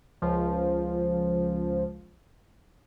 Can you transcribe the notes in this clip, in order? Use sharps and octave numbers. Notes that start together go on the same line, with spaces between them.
C#2 F3